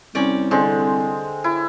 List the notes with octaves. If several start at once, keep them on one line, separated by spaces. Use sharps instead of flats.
C2 C#4 D5 G5
D3 G#3 C4
E4